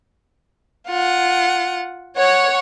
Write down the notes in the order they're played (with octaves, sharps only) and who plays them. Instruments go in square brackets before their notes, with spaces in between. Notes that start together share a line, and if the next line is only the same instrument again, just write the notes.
[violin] F4 F#5
[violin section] C#5 [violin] F#5